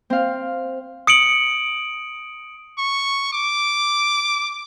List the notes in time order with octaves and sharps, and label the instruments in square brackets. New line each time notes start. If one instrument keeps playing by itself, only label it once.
[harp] C4 F5
[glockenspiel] D#6 C#7 D7 F#7
[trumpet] C#6
D6